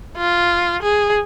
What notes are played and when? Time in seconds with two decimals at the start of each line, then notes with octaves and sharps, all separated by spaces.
0.17 F4
0.83 G#4